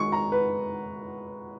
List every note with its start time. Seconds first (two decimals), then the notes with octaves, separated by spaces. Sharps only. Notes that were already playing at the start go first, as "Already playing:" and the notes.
Already playing: D#3 G#3 D#4 C#6
0.12 A#5
0.32 B4